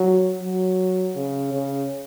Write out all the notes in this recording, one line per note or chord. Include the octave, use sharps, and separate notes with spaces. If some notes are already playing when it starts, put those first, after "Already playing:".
Already playing: F#3
F#3
C#3
C#3